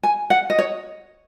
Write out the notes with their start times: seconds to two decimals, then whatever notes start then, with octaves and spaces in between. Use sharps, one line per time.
0.03 G#5
0.30 F#5
0.50 D#5
0.59 C#5